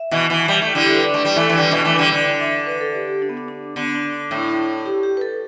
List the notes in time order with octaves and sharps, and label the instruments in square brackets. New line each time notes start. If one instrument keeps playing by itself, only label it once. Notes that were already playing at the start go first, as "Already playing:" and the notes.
Already playing: [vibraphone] E5
[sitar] B2 E3
B2 E3
G3
A3
[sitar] D3 G3 [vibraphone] E4
[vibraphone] G4
A4
B4
D5
[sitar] A3
[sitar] G3 [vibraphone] D5
[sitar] E3 A3 [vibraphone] A4
[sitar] E3
[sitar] D3 G3 [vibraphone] B4
[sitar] B2 E3
[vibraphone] D5
[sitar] E3 A3
[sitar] D3 G3 [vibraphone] B4
[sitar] D3 [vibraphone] D5
[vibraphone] E5
D5
B4
A4
G4
G4
D4
B3
D4
D4
[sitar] D3 [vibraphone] B3
[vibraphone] D4
D4
[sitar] A2 [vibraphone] E4
[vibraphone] G4
G4
B4
A4